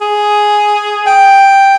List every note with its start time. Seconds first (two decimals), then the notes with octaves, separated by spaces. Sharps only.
0.01 G#4
1.06 G5